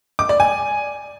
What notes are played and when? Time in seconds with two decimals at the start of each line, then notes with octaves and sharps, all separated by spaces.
0.19 D6
0.29 D5
0.40 G#5